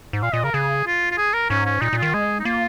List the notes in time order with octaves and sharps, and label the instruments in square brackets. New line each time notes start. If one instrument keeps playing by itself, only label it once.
[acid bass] G#2
[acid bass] A#2 [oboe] F5
[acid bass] A#2 [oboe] D#5
[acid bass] C#3 [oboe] A#4
[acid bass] C#3 [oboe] G#4
[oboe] F4
F4
G#4
A#4
[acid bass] G#2 [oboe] C#4
[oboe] C#4
[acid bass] A#2 [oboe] D#4
[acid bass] A#2
[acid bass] D#3 [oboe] F4
[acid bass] G#3 [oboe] G#4
[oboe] D#4
[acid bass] A#3 [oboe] F4